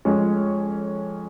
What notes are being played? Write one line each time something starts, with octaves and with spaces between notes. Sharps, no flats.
F2 F3 G#3 C#4